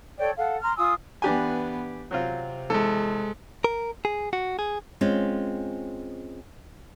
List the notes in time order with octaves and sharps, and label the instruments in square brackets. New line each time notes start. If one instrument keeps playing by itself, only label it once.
[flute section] A4 C#5 D5 G5
A4 F5 F#5
A#5 C6 F6
F4 G#5 D#6 E6
[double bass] E3 B3 [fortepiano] D4 G4 G#5
[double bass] C3 [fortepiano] F#3 C4 F4
[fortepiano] E2 [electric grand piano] G#3 A4
[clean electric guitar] A#4
G#4
F#4
G#4
[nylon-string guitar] G#3 C4 C#4 F4